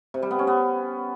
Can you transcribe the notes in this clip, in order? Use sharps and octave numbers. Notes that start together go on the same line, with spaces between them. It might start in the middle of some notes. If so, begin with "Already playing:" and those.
C3
G3
B3
C#4
B3